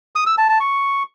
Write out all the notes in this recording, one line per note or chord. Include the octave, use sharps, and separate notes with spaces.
D#6
E6
A5
A5
C#6